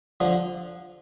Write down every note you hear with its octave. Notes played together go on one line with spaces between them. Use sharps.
D3 F3